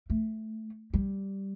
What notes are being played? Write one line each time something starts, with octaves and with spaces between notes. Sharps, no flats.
A3
G3